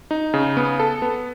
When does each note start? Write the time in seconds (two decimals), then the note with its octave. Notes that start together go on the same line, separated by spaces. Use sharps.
0.11 D#4
0.34 C#3
0.57 B3
0.80 A4
1.02 B3